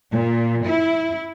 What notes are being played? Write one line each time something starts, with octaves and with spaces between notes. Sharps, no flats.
A#2
E4